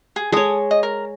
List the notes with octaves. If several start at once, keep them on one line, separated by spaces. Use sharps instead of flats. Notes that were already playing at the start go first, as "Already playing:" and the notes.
G#4
G#3 A4 C#5 D#6
D#5
A#4